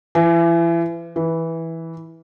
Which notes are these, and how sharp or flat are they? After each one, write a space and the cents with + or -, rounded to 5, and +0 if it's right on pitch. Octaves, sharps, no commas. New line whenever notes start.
E3 +35
E3 -10